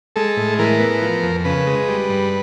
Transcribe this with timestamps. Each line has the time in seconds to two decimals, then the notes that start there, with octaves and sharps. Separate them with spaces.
0.16 G#3 A4
0.37 A2
0.59 E3 A#4
0.80 B3
1.01 F3
1.23 F2
1.45 C#3 B4
1.67 G#3
1.88 G3
2.09 G2